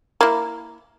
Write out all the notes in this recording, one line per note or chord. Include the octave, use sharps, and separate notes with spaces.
A#3 E4